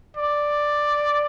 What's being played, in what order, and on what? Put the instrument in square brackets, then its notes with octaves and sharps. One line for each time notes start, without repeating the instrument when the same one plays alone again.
[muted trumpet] D5